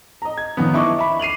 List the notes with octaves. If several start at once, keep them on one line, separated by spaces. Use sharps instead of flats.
D#5 A#5
G#6
F#2 D#3 F3 B3
D4 E4 D#5 C#6 D6
E5 B5
C7 D#7 F7 F#7